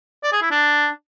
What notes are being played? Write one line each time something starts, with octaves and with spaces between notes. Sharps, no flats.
D5
G#4
E4
D4